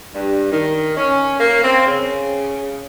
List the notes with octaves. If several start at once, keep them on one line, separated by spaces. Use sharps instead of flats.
G2
D#3
C#4
A#3
C4
C#3